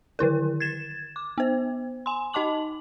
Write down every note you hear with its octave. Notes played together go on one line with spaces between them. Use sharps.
D3 D#3 E4 A#4
G#6 A6 E7
D6
B3 C5
G#5 C6
D#4 D#5 A5 D6 F#7